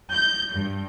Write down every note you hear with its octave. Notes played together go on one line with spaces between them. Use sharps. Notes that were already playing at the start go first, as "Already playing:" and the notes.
G6
G2